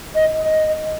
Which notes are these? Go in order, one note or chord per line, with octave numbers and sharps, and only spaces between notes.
D#5
D#5